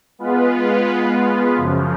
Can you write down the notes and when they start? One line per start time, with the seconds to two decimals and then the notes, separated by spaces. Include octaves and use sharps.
0.19 G#3 B3 F4 B4
1.56 F#2 C#3 F3